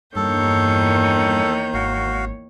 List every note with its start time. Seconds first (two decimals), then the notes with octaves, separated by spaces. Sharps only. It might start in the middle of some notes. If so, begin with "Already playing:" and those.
0.16 E2 G2 D#3 A#3 A4 C#5 G6
1.74 G#1 F#4 F5